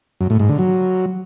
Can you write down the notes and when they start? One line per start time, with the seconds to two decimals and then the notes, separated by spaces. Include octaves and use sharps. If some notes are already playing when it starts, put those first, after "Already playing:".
0.21 F#2
0.30 A2
0.40 G#2
0.49 D3
0.59 F#3